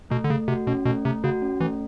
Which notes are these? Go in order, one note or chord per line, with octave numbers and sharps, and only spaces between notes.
B2 A3
D3
C#3 A3
C3 F#4
B2 C#4
B2 A3
C3 A3
C#3 F#4
C#4
E3 A3